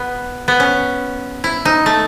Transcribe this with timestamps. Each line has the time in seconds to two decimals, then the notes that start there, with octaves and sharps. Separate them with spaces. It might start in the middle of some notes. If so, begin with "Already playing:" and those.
Already playing: B3
0.48 B3
0.60 C#4
1.44 E4
1.65 D#4
1.86 A3